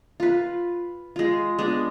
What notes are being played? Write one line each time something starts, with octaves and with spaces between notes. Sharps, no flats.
F4 B4
G#3 F4
G#3 B3 D4